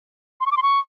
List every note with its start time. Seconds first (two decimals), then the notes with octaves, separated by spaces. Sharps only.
0.41 C6
0.46 C#6
0.52 D6
0.57 C6
0.62 C#6